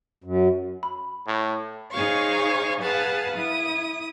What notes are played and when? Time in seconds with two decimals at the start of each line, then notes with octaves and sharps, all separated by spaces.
0.24 F#2
0.83 B5
1.27 A2
1.92 D#4 G#4 C5 C#5 F5 C#6
2.80 G#4 B4 F5 F#5 A5
3.36 E4 D#6